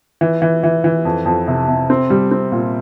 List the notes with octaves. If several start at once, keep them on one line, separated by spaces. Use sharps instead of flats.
E3
E3
E3
E3
F2
F2
C3
C3
C4
G3
C4
A#2